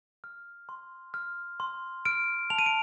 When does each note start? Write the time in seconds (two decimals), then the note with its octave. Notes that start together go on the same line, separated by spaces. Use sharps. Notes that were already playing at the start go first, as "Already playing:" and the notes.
0.24 F6
0.69 C6
1.14 F6
1.60 C6
2.05 F6 D7
2.50 A5 F7
2.59 D#7
2.66 D7